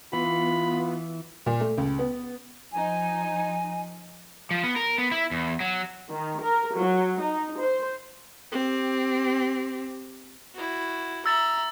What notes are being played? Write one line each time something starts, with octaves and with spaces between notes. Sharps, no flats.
E3 B3 F4 B5
A#2
A3
C#2
B3
F3 D#4 G#5
F3
B3
A#4
B3
E4
E2
F#3
D#3
A#4
F#3
D#4
C5
C4 G4
E4 F#4
E5 A#5 E6 A6